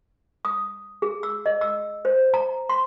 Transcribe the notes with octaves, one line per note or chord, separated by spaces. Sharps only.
D#6
G#4
E6
D#5
E6
C5
A#5
C6